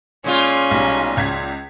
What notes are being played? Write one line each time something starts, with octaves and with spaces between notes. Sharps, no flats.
A#2 G#3 C#4 F4
B1 G3 B6
C#2 G#6 B6